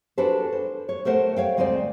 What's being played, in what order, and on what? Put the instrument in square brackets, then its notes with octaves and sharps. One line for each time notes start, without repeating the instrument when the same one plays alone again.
[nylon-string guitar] D4 F#4 G#4 A4 B4 C5
C5
C#5
A3 A#4 C5 E5 F#5
C#5 F5 G5
D2 G#3 C4 C5 D5